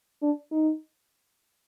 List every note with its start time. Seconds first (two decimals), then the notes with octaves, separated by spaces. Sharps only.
0.23 D4
0.52 D#4